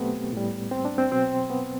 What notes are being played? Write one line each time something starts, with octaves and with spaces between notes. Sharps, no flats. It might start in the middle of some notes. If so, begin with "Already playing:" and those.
Already playing: B2 F#3 A3 B3 C4 G4
A2 G3
C4
D4
C4
B2 F#3 C4
B3